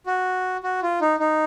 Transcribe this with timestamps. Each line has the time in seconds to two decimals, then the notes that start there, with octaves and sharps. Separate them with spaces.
0.06 F#4
0.63 F#4
0.82 F4
1.01 D#4
1.19 D#4